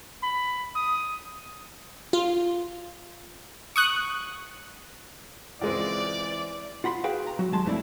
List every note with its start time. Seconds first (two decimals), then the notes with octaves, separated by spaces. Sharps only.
0.23 B5
0.75 D#6
2.13 F4
3.76 C#6 D#6 F#6
5.61 C#2 E3 G#3 C4 D5
6.84 F4 F#5 B5 C6
7.04 F#4 G#4 B4 F5 G5
7.27 A#5
7.39 F#3 F#4
7.52 D#2 G#3 A5 C6
7.66 F2 E3 A3 C4 D4 E4